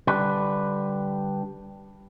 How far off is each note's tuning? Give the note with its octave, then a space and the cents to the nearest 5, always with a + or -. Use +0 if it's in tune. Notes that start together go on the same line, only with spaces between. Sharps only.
D3 +0 G3 +0 B4 +0